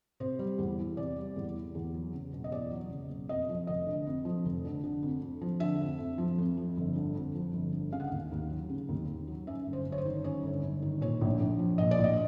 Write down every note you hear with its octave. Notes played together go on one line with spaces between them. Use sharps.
C3 C5
G3
E2
E3
C3 D5
G3
E2
E3
E2
F#3
F#1
B2
D#5
E2 D5
F#3
F#1
B2
F2 D#5
F3
F1 D#5
D3
F2
F3
F1
D3
D3
F2
F2
F3
D3 E5
F2
F2
F3
F2
F3
G1
D3
F2
F3
G1
D3
C#3 F5
F#5
D#2 F5
D#2
F#3
C#3
D#2
D#2
F#3
F#2 E5
G1
C5
G1
C#5
C5
D#3
F#2 C#5
G1
G1
D#3
A#2 C#5
A#1
A#1
F3
A#2 D#5
D5
A#1
D#5